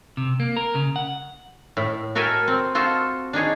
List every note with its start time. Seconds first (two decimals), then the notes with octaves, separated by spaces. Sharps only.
0.17 C3
0.40 A#3
0.56 A#4
0.75 C#3
0.96 F#5
1.77 A2
2.15 F#4 A4 A#4 E5 G5 G#5
2.48 C4
2.75 F4 F#4 A4 C5
3.33 D4 D#4 G#4 C#5